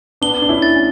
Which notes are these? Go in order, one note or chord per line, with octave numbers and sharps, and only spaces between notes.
B3 D4 G7
D4
C#4 E4
A6
C#4